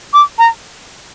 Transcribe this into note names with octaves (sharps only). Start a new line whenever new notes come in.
D6
A#5